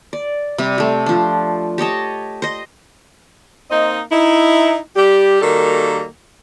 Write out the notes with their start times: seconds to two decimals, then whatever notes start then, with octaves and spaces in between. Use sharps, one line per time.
0.13 D5
0.58 C3 G3 G4
0.78 A3 G4
1.06 F3 D4
1.78 G4 C#5 D#5 A5
2.42 C5 D#5
3.70 A#3 C4 D#4 D#5
4.10 D#4 E4
4.96 G3 G4
5.41 D#3 G3 A#3 F#4 A4